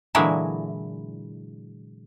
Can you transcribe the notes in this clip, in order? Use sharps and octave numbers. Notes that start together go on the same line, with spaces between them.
A#2 D3 E3 F#3 G#3 E4